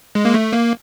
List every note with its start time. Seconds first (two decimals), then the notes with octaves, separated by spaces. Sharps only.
0.15 G#3
0.25 A#3
0.34 A3
0.53 A#3